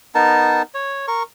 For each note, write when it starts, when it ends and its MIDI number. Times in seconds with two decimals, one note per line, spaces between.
0.15 0.62 59
0.15 0.62 63
0.15 0.62 70
0.15 0.62 81
0.74 1.06 73
1.08 1.23 70
1.08 1.23 85